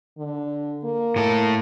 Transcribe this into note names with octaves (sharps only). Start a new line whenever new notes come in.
D3
A#3
A2 A4